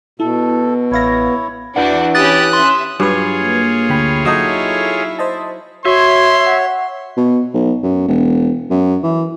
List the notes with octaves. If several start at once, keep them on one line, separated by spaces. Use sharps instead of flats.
B2 E4 A4
A1 E4 C#5 F5 A#6
D4 E4 F#4 B4 D5 F#5
C#4 G4 B5 D#6 F#6 A6
C#4 E5 C6
G2 F#3 F4 G#4 B4 C#5
A#3
D2 G5 B5
F#3 D#4 E4 A4 D#5 C#6
C5 D#5 A5
F#4 C#5 E5 C6 G#6
F#5
B2
B1
F#2
E1
F#2
E3